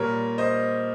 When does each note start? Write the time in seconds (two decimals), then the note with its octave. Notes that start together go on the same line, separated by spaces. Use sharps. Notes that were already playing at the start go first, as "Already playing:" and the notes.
Already playing: A#2 G3 A#4 C#5
0.38 C5 D#5